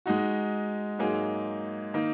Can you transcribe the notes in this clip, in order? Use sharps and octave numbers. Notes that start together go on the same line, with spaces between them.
G#3 D#4 F#4
G#2 F#3 A#3 D#4 G#4
D#3 A#3 D#4